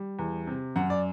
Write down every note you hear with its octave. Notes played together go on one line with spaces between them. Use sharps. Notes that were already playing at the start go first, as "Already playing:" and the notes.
Already playing: G3
E2
C3
F#2 F#5
D5